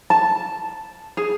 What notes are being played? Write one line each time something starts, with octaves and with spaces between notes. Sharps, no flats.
A5
G#4